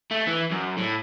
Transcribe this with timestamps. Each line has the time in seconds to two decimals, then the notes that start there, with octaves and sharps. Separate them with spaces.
0.11 A3
0.27 E3
0.51 F#2
0.78 A2